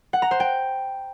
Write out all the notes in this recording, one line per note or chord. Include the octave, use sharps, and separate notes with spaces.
F#5
A#5
C5
G5